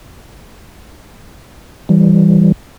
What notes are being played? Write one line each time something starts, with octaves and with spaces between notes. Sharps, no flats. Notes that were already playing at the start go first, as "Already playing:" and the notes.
E3 G3